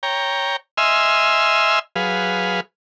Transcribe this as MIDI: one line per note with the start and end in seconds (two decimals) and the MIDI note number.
0.03 0.56 73
0.03 0.56 79
0.03 0.56 82
0.77 1.79 75
0.77 1.79 76
0.77 1.79 80
0.77 1.79 84
0.77 1.79 88
0.77 1.79 89
1.96 2.60 54
1.96 2.60 68
1.96 2.60 71
1.96 2.60 77